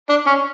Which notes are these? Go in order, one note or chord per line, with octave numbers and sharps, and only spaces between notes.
D4
C#4